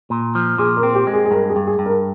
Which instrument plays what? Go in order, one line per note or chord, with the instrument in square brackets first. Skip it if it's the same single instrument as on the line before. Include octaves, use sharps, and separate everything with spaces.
[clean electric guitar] A#2
F3
[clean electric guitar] A#2 [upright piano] G#4
[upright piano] A#4
[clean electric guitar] C4
[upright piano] G4
[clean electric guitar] G#3
[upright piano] G#4
G#4
[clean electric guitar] G2 [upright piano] A#4
[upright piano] G#4
[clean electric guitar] G2
[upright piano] G#4
[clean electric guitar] G2
[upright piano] A#4